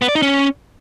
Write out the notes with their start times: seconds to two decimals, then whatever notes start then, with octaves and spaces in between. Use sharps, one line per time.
0.02 B3
0.08 D5
0.15 D#4
0.22 C#4